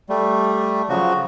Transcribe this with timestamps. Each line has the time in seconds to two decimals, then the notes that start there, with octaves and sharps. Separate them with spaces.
0.09 G3 A3
0.89 C#3 F3 F#3 F#4